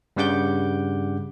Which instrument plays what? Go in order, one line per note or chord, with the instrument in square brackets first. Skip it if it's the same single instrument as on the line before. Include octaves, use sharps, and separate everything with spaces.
[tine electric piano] G2 C#3 G3 F#5 D6 G6